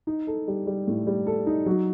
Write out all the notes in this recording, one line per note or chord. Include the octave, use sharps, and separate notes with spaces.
D#4
A4
G3
G3
A2
G3
A4
D#4
F#3